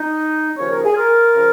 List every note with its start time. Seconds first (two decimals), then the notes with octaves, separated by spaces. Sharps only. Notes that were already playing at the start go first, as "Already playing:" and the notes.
Already playing: D#4
0.57 D#2 C#3 F3 C#5
0.70 A#4
0.84 G#4
0.97 F4 A#4
1.35 C#3 F3